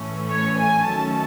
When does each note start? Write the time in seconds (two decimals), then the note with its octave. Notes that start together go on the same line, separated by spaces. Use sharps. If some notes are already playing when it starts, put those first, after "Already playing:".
Already playing: A2 E3 A3 C#4
0.30 C#5
0.59 G#5
0.87 D#3 F#3 A3 C#4 A5